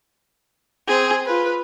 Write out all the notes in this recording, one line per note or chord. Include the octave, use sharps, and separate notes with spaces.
C4 G#4
F4 B4